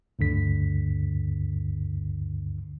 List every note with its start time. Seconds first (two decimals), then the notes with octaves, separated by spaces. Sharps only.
0.19 D2 G2 D3 B6